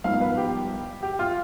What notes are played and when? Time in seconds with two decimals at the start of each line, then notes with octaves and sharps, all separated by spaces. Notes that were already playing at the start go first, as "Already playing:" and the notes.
0.04 G#1 G2 F3 B3 D#4 F5
0.21 B4
0.37 G4
1.03 G4
1.19 F4